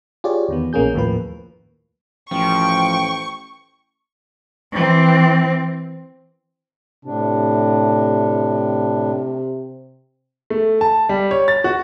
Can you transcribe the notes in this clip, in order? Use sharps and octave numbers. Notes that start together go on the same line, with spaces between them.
F4 G4 G#4 C#5 D5
E2 D#3 B3
A#1 A#3 C#4 G#4 G6
D#2 A2 F3 A#3 B4
A1 F3 G5 C#6
E3 C4
A2 C3 D4
A3
A5
G3
C#5
A6
F#4